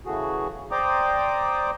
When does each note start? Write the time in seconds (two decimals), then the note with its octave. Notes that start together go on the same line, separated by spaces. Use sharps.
0.06 C#3 E3 A3 F#4 G#4
0.71 C5 D5 G5 A#5 D6 D#6